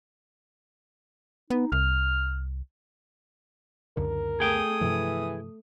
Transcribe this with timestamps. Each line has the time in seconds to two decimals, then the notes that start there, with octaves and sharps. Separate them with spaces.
1.50 B3 D#4
1.72 C2 F6
3.97 C#2 F#2 D3 A#4
4.40 A3 G#4 G5 D#6
4.81 G2 C3 E3 F3